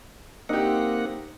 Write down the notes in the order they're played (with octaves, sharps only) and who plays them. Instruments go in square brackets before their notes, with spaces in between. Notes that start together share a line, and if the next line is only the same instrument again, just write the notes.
[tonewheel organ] A#3 C4 F#5 [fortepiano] D#4 G4